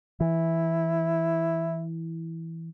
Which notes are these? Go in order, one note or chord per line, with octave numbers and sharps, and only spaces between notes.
E3 E4